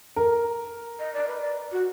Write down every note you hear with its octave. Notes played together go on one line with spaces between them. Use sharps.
A#4
D#5
D5
B4
D5
F#4